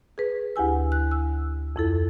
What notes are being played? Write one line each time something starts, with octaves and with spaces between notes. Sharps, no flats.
G#4 B4
D2 E4 G4 G#5 E6
F#6
E6
F2 E4 A4